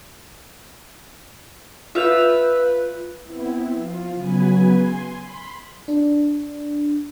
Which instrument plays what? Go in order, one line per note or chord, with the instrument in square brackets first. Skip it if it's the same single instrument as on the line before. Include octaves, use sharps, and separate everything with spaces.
[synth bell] F4 G6 [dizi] B4 [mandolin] E5 F5
[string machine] B3 C4 E4
F3 F4
C#3 F#3 B3 B4 G#5
G#5 C6
B5 C6
[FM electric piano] D4